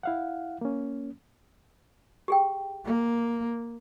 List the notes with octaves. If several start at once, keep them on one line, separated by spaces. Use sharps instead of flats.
E4 F5 F#5
A#3 C#4
G4 G#4 G5
A#3